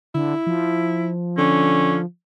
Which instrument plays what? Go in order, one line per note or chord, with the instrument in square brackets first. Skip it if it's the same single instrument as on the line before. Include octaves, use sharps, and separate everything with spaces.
[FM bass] D3 [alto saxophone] E4
[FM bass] F3
[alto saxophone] D3 [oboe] C#4